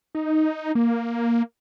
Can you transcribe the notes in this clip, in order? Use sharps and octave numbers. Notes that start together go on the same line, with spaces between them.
D#4
A#3